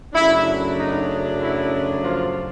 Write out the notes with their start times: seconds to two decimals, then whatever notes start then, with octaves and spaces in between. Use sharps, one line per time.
0.13 F#2 C#3 F#3 A3 D4 E4
0.77 D#4
1.40 E4
2.02 F3 F4